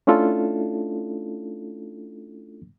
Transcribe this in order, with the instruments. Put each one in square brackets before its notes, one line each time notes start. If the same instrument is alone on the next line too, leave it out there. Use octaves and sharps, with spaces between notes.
[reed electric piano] A3 C#4 D4 E4 F4 A4